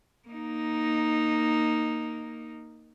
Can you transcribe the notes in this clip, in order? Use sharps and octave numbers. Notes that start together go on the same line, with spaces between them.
A#3 D#4